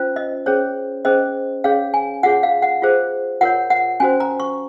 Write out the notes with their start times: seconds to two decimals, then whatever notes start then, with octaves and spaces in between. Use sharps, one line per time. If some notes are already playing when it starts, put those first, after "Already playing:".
Already playing: C#4 F4 C5
0.16 D#5
0.46 C#4 G#4 C5 C#5
1.05 C#4 G#4 C5 D#5
1.64 C#4 G#4 C#5 F5
1.94 G#5
2.23 F4 G#4 C#5 F#5
2.43 F5
2.62 F#5
2.82 F4 G#4 C5
3.41 F4 A#4 C#5 F#5
3.70 F#5
4.00 C#4 F#4 C5 G#5
4.20 A#5
4.40 C#6